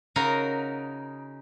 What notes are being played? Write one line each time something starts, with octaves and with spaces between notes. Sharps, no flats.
C#3 D#4 F#4 A#4